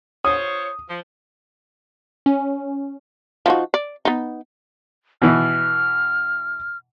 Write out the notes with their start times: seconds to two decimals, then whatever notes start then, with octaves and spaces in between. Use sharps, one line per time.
0.25 F4 C5 C#5 D#6
0.89 F3
2.26 C#4
3.46 F3 D#4 F#4
3.74 D5
4.05 B3 D#4
5.22 B2 E3 F6